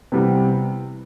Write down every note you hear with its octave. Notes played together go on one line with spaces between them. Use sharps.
C3 E3 G3 B3